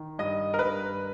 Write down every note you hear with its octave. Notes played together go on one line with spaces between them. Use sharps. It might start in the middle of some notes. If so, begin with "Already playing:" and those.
Already playing: D#3
G2 D#5
A#4
G2 B4